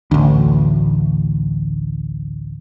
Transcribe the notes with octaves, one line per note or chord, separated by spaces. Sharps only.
A1 D2